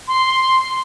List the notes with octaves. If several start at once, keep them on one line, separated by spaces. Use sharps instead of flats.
C6